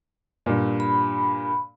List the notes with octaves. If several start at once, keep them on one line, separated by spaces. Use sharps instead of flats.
G2 A#2
B5